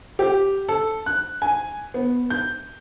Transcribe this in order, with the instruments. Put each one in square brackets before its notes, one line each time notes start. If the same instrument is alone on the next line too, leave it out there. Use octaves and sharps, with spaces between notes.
[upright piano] G4
A4
F#6
G#5
B3
G6